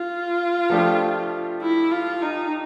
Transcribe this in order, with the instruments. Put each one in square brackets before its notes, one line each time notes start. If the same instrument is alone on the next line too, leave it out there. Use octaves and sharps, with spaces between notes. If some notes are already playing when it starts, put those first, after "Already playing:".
Already playing: [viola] F4
[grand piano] F3 A3 D4 G4
[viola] E4
F4
D#4